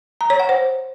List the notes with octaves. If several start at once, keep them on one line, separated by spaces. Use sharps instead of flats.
A#5
C#5
F#5
C5